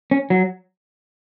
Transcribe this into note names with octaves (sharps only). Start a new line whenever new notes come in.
C#4
F#3